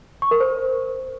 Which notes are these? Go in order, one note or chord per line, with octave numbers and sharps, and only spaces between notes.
C#6
A#4
C5